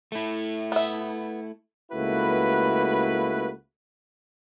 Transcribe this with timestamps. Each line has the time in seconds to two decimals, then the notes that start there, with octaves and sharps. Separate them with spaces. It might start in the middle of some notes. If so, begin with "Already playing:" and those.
0.12 A3 E4
0.72 B3 E5
1.92 C#2 A3 A#3 E4 F#4 B4